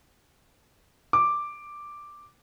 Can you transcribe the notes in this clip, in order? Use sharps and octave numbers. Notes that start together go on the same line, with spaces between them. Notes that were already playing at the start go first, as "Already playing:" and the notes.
D6